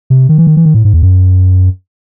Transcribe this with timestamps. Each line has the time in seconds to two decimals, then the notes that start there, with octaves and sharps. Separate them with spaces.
0.10 C3
0.29 D#3
0.38 E3
0.47 D#3
0.57 E3
0.65 D#3
0.74 A2
0.85 G#2
0.94 E2
1.03 F#2